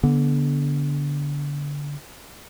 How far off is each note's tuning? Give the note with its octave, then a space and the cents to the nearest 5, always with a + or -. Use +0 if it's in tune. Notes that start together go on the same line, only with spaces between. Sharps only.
D3 -20 B3 -25